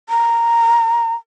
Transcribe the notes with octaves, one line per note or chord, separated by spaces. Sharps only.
A#5